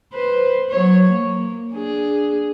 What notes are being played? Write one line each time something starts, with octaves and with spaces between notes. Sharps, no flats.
B4 C5
F#3 C#5
A#3
D4 G#4